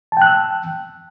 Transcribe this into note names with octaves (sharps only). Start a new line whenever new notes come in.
G5 A5 E6 F#6